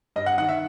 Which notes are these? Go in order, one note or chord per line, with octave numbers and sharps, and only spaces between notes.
G2 D#5
F#5
D#3 F#5
E5